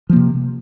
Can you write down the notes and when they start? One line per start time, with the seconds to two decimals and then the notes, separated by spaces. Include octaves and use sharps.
0.10 F3
0.13 A#3
0.16 C3